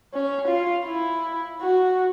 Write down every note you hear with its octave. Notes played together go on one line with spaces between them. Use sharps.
C#4
F4
E4
F#4